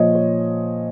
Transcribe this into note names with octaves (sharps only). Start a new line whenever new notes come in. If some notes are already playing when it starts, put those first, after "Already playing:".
Already playing: A#2 F3 C#5 D#5
C#5